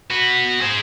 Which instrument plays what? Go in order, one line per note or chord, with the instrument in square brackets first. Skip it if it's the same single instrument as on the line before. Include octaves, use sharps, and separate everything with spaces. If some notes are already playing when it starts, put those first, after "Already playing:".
[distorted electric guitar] F#4 B4
G#4 C5